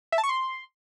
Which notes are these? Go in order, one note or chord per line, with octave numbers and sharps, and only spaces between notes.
E5
A5
C#6
C6